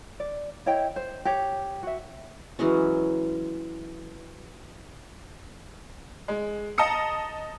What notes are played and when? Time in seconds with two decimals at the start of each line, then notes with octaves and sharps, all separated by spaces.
0.20 D5
0.66 E4 C#5 D#5 G5
0.96 C5
1.25 G4 C#5
1.83 F#4 E5
2.59 E3 F#3 G#3 C#4
6.28 G#3
6.78 D#5 A5 A#5 D#6 C#7